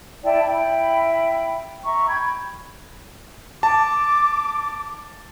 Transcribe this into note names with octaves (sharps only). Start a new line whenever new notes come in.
E4 D5 G5 A5
E4 G5 B5
E5 A#5 C#6
G5 B5 G#6
A5 D6